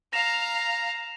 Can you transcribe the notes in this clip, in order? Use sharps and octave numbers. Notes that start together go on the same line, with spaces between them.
F5 A#5 A#6 E7 F7